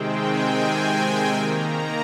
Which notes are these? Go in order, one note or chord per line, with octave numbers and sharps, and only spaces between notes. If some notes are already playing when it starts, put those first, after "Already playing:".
Already playing: C3 D#3 G#3 C4 G5
G#5
D#3 A#3 A#5